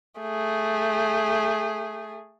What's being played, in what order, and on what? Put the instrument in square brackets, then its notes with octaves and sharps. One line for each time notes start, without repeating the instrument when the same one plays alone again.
[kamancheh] A3 G#4